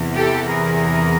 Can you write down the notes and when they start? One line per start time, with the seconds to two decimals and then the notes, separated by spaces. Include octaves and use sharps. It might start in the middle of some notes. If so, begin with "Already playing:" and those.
Already playing: E2 C3 E3
0.16 G4 A4
0.51 G#4 A#4